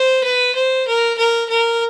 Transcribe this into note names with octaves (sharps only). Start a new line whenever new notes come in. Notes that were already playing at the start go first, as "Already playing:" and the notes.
Already playing: C5
B4
C5
A#4
A#4
A#4